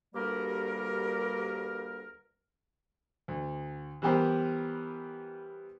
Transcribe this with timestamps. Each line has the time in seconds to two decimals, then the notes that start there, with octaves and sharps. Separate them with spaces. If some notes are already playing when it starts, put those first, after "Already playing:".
0.15 D2 G2 G3 A#3 G4 A#4
3.28 D2
4.02 E3 G3 B3 G4 A#4 C5